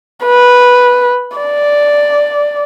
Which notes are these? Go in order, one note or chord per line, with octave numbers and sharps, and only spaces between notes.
B4
D5